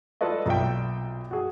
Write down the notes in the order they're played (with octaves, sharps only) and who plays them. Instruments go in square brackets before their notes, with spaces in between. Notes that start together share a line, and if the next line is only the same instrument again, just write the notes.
[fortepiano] F4 A4 B4 D5 D#5
B1 A#2 E5 G5
F#4 G#4